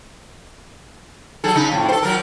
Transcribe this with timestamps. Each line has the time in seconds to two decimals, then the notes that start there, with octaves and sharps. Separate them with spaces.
1.44 F#3 G#4 A4
1.55 C#3 D#4
1.71 F2 A2
1.88 A4 C5
2.03 F3 F#3 A#4